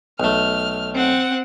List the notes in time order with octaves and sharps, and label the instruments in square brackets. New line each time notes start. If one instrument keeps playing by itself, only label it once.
[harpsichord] B1 A3 [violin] F6
[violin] C4 F#5